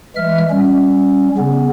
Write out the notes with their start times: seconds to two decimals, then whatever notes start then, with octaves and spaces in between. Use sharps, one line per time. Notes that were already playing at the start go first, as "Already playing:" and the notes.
0.16 E3 G#3 E5 F6
0.50 G3 C#4
1.37 C#3 B3